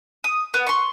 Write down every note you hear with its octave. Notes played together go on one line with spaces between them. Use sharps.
D#6
B3
C6 C#6